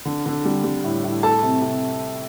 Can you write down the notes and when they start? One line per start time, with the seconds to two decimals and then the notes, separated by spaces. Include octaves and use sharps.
0.05 D3
0.26 D3
0.45 G3
0.64 G3
0.84 A2
1.04 A2
1.23 A3 A4 A5
1.43 C3
1.62 C3